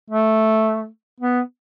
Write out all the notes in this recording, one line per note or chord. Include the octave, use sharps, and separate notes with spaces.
A3
B3